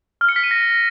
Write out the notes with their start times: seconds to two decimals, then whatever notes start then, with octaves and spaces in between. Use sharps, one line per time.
0.21 F6
0.29 C#7
0.36 B6
0.44 D#7
0.51 A#6